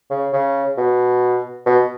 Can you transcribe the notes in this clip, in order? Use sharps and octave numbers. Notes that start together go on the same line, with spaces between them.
C#3
C#3
B2
B2